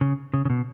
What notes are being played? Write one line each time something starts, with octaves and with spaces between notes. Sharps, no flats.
C#3
C#3
C#3
B2